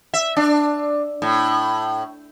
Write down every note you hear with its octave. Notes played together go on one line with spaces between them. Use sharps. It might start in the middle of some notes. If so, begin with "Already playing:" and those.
E5
D4
A2